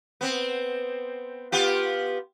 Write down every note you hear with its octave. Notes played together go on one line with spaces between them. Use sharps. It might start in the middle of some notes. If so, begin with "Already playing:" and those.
B3 C4
B3 F4 G4